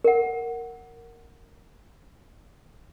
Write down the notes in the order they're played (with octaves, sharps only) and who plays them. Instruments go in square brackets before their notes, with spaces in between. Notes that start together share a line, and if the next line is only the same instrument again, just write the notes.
[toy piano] A#4 F#5